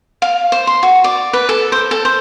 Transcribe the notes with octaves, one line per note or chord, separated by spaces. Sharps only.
F5
C5
C6
F#4
D5
B4
A4
C5
A4
C5